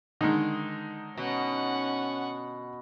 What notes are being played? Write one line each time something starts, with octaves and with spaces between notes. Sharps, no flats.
D3 D#3 G#3 D#4
B2 C#4 F#5